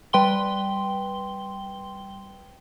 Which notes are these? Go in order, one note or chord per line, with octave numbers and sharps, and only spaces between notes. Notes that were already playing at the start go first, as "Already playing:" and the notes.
G3 B4 G5 C6 G7